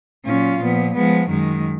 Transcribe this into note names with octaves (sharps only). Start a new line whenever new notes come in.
A#2 F#3 C#4 F4
A#2 F3 B3
F3 G#3 B3
F#2 D#3 G#3